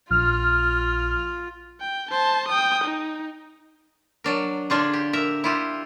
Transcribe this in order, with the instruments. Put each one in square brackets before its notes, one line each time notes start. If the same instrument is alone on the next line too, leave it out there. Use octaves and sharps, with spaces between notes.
[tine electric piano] A#1 [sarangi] F4 [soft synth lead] F6
[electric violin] G5
C5 A5
G5 D#6
D#4
[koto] F#3 D4 A#4
D3 D4 F4 G#4
G4
A#4 E5
E4 F4 G4